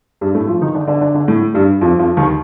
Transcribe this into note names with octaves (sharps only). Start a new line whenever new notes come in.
G2 G3
A2 A3
F3 F4
D#3 D#4
D3 D4
D3 D4
D3 D4
D3 D4
A2 A3
G2 G3
F2 F3
F2 F3
D#2 D#3